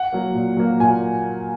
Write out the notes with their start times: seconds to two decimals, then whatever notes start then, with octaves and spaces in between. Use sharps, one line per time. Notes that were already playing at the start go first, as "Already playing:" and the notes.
Already playing: F#5
0.12 F#3 A#3
0.34 A#2
0.57 F#3 A#3
0.80 A#2 G#5